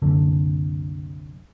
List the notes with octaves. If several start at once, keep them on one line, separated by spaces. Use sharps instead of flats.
F#1 C2 F#2 D3